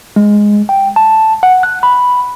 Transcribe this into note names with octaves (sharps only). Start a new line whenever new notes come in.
G#3
G5
A5
F#5
F#6
B5